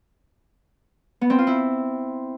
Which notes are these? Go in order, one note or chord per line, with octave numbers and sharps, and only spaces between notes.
B3
C4
F4
E4